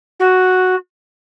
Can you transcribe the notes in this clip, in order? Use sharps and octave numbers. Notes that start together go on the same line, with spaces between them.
F#4